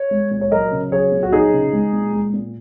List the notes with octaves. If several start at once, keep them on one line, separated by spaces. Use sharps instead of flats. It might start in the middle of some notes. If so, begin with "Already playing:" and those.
Already playing: C#5
G#3
A#2
C#5
F#3 A#4 D#5
C#3
F#3 G#4 C#5
A#2
F#4
F#3 D#4 G#4
C#3
G#3
A#2
G#3
A#2